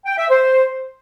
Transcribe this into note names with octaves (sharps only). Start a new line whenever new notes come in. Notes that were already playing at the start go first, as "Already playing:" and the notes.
G5
E5
C5